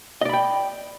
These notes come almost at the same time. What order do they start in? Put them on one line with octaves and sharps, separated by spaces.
D#5 D5 B5 G5